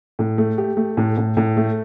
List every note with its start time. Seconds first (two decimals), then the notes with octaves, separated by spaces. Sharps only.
0.19 A2
0.38 A3
0.58 G4
0.77 A3
0.97 A2
1.17 A2
1.37 A2
1.57 A3